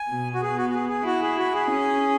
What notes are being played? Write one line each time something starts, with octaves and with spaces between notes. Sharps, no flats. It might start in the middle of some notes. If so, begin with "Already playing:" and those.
Already playing: G#5
B2
F#4
B3 G#4
F#4
F#4
G#4
G#4
E4 F#4
G#4
F#4
G#4
C#4